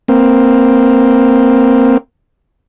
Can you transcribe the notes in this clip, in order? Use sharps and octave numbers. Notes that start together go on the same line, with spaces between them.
A#3 C4